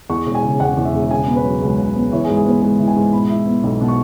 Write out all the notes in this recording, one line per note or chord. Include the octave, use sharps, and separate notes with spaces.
E2 C#6
E1
G#5
C#3
E1 F#5
E2
E5
E1
C#3 G#5
B3
B4
F#3
C#2
C#3
B3
E3 C#5
G#4
G#2
G#4
B3 B4
G#2 G#4
E3
G#5
G#2
B2 B5
E4
B3
B1
B2
C#6